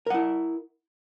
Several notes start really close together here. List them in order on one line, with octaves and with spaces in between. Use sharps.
A#4 F#5 E4